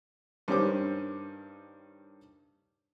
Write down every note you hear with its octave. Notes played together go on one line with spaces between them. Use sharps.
G2 D#3 C#4 G4 C5 D6